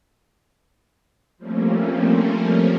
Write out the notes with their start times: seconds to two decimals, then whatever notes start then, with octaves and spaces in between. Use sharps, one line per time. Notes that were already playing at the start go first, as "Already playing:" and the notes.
1.38 F3 G3 A3 A#3 C4 C#4